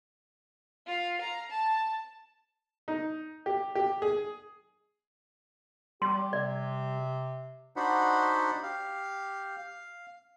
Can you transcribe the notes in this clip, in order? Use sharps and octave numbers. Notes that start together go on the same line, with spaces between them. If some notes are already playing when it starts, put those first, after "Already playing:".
F4 F5
F5 A#5
A5
D#4
G4
G4
G#4
G3 G4 C6
C3 D5
D4 D#4 F#4 C5 F#5 B5
G4 F5
F5